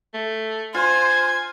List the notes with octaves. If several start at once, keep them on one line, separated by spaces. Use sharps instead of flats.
A3
F4 C5 G#5 G#6